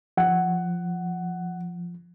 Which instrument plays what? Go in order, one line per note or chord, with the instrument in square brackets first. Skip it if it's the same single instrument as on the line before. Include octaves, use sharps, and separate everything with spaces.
[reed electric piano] F3 [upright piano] F#5